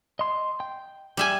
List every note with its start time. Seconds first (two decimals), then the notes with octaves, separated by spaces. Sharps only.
0.19 D#5 C6
0.60 G5
1.17 G3 E5 G#5